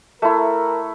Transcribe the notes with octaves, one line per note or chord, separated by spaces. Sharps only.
A3 E4 A#4